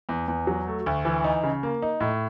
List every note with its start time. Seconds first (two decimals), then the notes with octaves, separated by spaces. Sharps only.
0.09 E2
0.28 E2
0.47 F#3
0.67 A3
0.86 D2
1.05 E3
1.24 D#4
1.43 C#3
1.63 A#3
1.82 D#4
2.00 A2